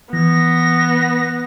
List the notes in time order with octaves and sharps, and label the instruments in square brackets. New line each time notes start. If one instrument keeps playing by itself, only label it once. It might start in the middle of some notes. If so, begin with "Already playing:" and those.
[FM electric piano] E3 [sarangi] B3 [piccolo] A#6